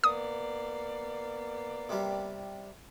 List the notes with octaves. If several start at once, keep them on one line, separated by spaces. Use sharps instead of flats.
A#3 B3 D5 D#6
C3 G3